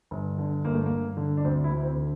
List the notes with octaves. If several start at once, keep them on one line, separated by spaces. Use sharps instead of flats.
G1
D3
G1 A#3
A3
G1 A#3
D3
D4
D2 C4
E4
D2
C4
D3